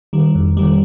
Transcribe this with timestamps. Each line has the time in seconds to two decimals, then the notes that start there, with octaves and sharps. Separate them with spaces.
0.13 D#3 G3
0.35 F2
0.57 D#3 G3